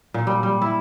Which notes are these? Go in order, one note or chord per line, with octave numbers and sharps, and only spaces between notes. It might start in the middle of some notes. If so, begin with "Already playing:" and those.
A#2
G3
G3
E4